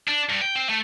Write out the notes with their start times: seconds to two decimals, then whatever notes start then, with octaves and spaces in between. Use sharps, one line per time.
0.08 D4
0.30 G2
0.42 G5
0.56 C4
0.69 A3